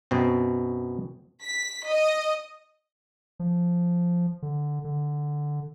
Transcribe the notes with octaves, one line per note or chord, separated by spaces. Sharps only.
F#2 B2 C4
B6
D#5
F3
D3
D3